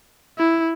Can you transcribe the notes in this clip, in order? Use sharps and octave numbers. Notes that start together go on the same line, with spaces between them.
E4